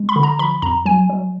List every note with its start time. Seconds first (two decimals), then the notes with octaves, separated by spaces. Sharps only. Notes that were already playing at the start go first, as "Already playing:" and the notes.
Already playing: G#3
0.09 B5
0.16 D3
0.23 A#5
0.39 F3 B5
0.62 F2 A#5
0.86 F#3 G#5
1.09 F#3